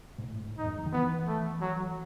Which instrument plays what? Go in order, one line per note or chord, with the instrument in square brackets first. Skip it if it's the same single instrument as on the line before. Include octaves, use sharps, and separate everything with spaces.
[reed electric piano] G#2
A2
G#2
[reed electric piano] E2 [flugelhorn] D#4
[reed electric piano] F#2
E2
D#3
[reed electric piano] E3 [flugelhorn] B3
[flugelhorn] A3
F#3